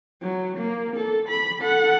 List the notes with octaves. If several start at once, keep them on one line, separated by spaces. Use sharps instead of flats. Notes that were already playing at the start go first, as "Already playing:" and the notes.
F#3
A#3
A4
B5
A4 F#5